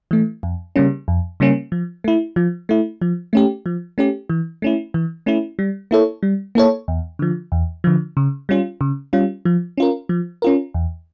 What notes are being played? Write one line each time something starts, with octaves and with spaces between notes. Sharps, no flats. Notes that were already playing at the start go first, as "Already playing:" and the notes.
E3 A3
F2
C#3 G3 A#3 C#4
F2
C#3 G3 A#3 C#4
F3
A3 E4
F3
A3 E4
F3
A3 C#4 G4
F3
A3 C#4 G4
E3
A3 C#4 E4
E3
A3 C#4 E4
G3
A#3 E4 A4 C#5
G3
A#3 E4 A4 C#5
E2
D3 F3
E2
D3 F3
C#3
G3 C#4 F4
C#3
G3 C#4 F4
F3
C#4 F4 A#4
F3
C#4 F4 A#4
E2